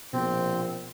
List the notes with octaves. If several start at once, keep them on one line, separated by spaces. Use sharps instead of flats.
A#1 B2 C4